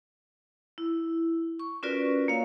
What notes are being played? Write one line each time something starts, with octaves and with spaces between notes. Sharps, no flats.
E4
C#6
C#4 F4 F#4 A#4 B4 D5
A#3 C#5 F5